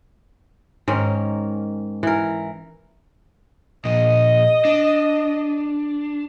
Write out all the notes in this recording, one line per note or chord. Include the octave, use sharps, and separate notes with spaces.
G#2 D#3 C#4 A#4
E3 A#4
A#2 F3 D#5
D4